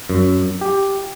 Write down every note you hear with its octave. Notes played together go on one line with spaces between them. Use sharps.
F#2
G4